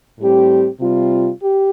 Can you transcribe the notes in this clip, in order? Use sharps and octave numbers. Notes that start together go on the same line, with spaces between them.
A2 G3 C4 G4
C3 G3 C4 F4
G4